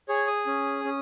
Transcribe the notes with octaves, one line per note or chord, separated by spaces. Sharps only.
G#4 C#5
D#6
C#4
C#4